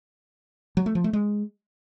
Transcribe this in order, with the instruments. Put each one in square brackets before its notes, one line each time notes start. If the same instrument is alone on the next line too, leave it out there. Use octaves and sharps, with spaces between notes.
[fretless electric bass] F#3
A3
F3
A3
G#3